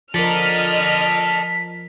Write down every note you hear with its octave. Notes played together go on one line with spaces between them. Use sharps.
F3 A4 A#4 D5 D#5 F6 B6